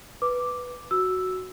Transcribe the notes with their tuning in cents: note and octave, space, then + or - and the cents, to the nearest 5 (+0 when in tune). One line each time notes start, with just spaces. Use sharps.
B4 +0 D6 +0
F#4 +0 E6 +0